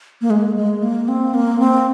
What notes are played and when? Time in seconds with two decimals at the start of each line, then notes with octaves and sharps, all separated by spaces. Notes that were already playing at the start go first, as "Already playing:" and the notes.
0.21 A#3
0.30 G#3
0.56 G#3
0.83 A#3
1.08 C4
1.34 A#3
1.60 C4